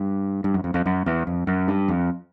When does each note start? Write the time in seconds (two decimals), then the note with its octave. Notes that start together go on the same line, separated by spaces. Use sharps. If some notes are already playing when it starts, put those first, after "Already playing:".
Already playing: G2
0.44 G2
0.54 F#2
0.64 F2
0.74 F2
0.86 F#2
1.06 E2
1.27 F2
1.47 F#2
1.68 G2
1.88 F2